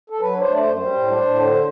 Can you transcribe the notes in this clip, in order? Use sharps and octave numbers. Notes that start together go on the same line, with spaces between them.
A4
F#3 B4
D4 C5
A3 D5
C5
F#2
G3 C5
A2
D4
A2
D3